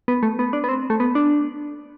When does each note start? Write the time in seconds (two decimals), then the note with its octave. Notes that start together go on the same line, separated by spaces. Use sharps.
0.08 B3
0.23 A3
0.39 B3
0.53 D4
0.64 B3
0.69 C4
0.90 A3
1.00 B3
1.15 D4